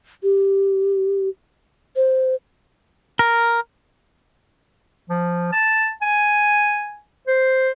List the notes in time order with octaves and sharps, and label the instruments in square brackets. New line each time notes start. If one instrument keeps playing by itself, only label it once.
[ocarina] G4
C5
[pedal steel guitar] A#4
[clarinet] F3
A5
G#5
C5